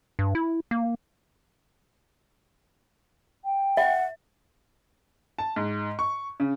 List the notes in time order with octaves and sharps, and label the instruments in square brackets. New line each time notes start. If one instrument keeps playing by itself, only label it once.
[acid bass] G2
E4
A#3
[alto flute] G5
[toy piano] E5 [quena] F#5
[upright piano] A5
G#2
C#6
C#3